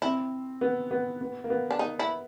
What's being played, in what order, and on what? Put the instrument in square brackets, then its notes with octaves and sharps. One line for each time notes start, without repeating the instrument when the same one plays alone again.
[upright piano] C4 [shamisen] E4
[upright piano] B3
B3
B3
A#3
B3
[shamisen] D4
[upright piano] A#3 [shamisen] D#4
[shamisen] E4